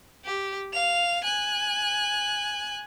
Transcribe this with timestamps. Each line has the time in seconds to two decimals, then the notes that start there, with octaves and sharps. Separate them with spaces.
0.24 G4
0.73 F5 F7
1.24 G#5 F#6